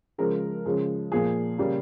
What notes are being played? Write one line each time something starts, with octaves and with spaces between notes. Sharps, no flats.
C#3 F3 G#3 A#4
C#3 F3 G#3
A#2 F3 A#3 G#4
C#3 G3 A#3